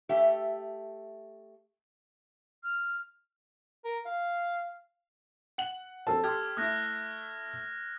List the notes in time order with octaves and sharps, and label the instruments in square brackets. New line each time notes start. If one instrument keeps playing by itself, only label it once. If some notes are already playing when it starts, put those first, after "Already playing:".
[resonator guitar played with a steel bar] A3 G4 E5
[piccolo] F6
[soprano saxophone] A#4
F5
[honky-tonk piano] F#5 F#7
[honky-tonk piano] C4 [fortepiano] A4 A5
[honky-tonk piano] G4 C6 [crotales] D#6 F6 G#6
[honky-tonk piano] A3 E4 [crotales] D#6 F#6 A#6